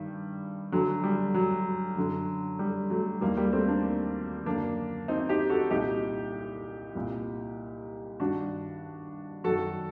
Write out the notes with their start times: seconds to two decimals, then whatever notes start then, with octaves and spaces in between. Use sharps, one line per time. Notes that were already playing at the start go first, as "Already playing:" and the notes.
Already playing: G2 D#3 G3
0.72 D2 D3 F#3
1.03 G3
1.34 F#3
1.97 F#2 D3
2.59 G3
2.90 F#3 A3
3.21 D#2 D#3 G3 A#3
3.37 G3 A#3
3.53 A3 C4
3.68 A#3 D4
4.46 F#2 D3 A#3 D4
5.08 C4 D#4
5.29 D#4 G4
5.49 F#4 A4
5.71 C2 A#2 D#4 G4
6.95 C2 A#2
8.20 G2 D#3 D4 F#4
9.44 F#2 D#3 F#4 A4